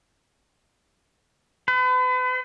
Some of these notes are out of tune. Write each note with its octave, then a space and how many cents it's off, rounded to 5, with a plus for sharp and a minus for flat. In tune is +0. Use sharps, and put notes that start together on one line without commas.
B4 +40